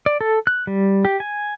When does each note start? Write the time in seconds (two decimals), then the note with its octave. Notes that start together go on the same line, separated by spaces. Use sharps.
0.06 D5
0.21 A4
0.47 F#6
0.67 G3
1.05 G4
1.20 G#5